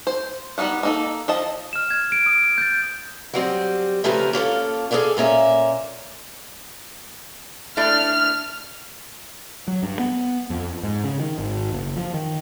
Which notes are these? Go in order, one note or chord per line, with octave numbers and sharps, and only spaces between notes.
C5
G3 B3 D#4 F5 F#5
A#3 D#4 A4
F3 D#5 A5
F6 E7
G#6
D7
D#6
G6 A6
F#3 G3 C4
C#3 F3 G3 A3 A#4 B4
A#3 C#4 F4 A4
G#4 A4 B4 D5 F5
A#2 A#3 C#4 E5
A3 D4 E4 F6
F#3
G2
B3
F2
G#2
C#3
D#3
G#1
F#1
F3
D#3